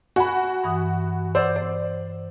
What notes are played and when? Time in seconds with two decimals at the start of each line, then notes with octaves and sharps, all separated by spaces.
0.16 F#4 G#5 B5
0.64 G2 E3 D#6
1.35 C5 D5 F#5 E6
1.56 C5 D5